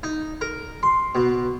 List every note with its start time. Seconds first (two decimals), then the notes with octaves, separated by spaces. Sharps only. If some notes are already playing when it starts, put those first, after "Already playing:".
0.03 D#4
0.41 A#4
0.83 C6
1.15 B2